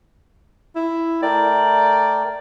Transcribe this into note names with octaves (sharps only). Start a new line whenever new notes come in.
E4
A3 A#4 D5 G5